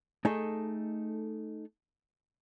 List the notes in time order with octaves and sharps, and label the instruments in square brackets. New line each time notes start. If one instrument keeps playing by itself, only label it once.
[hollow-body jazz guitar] A3 D#4 G#4 A4